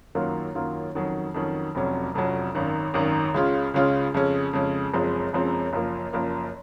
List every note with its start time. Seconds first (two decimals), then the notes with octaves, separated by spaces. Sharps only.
0.15 F#2 D#3 F#3 A#3 F4
0.55 F#2 D#3 F#3 A#3 F4
0.95 F2 D#3 F#3 C#4
1.34 F2 D#3 F#3 C#4
1.75 F1 F2 C3 F#3 C#4
2.15 F1 F2 C3 F#3 C#4
2.55 G#1 F#2 D#3
2.94 G#1 F#2 D#3
3.34 C#2 C#3 G#3 C#4 F4
3.74 C#2 C#3 G#3 C#4 F4
4.14 F2 C#3 G#3 C#4
4.53 F2 C#3 G#3 C#4
4.93 F#1 F#2 F3 G#3 C4
5.33 F#1 F#2 F3 G#3 C4
5.73 F#1 F#2 F3 A#3
6.13 F#1 F#2 F3 A#3